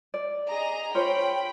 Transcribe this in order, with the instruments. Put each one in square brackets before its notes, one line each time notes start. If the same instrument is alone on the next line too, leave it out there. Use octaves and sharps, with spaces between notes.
[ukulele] D5
[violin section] G#4 D#5 A#5
[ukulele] F4 C5 C#5 [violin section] G5 B5